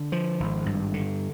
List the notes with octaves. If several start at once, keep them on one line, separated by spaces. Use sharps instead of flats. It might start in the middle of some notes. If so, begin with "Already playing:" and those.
Already playing: D3
F3
G#1
G2
D3